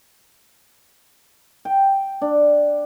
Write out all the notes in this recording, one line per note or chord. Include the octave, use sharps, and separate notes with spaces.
G5
D4